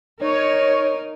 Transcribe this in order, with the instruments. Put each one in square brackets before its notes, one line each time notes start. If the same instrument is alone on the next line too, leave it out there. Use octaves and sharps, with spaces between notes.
[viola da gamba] D#4 A#4 [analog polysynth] C#5